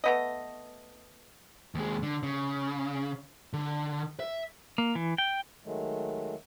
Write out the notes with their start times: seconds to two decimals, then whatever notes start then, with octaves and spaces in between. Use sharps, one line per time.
0.04 A3 B3 D#5
1.75 D#2 G#3
2.03 D3
2.23 C#3
3.53 D3
4.20 E5
4.78 A#3
4.95 E3
5.18 G5
5.65 D#3 F#3 G#3 A3